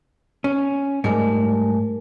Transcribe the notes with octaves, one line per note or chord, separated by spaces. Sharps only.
C#4
G#2 G3 A3 A#4 G#5